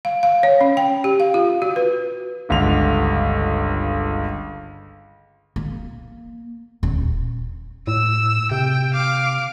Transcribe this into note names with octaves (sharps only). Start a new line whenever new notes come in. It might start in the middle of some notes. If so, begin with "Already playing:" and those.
F5
F5
C#5
C#4
G5
G4
F5
F4
F#4
B4
G1 C#2 D3 F7
A#3
D#1
A2 E6
C3 G5
F5 D6